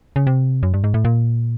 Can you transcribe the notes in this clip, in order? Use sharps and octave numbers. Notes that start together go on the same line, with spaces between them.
C#3
C3
F#2
G2
G#2
A2
A#2